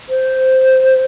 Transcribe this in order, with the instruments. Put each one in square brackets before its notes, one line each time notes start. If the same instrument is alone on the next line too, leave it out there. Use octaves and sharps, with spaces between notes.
[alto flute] C5